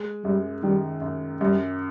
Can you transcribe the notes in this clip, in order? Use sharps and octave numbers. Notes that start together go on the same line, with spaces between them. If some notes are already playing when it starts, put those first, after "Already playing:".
Already playing: G#3
F#2 G3
D#3 G3
F#2
F#2 G3